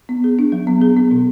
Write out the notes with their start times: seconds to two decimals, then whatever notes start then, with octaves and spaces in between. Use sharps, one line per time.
0.09 B3
0.24 G#4
0.39 D4
0.52 F#3
0.67 B3
0.82 G#4
0.97 B3
1.11 B2